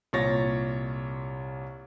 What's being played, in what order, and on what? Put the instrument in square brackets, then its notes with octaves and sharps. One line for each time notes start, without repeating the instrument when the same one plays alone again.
[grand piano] C2 A#2 F4 C#5 A6 A#6